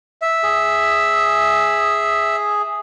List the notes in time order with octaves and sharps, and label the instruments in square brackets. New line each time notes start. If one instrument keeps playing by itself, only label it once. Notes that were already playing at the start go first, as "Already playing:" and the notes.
[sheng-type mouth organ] E5
[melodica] G#4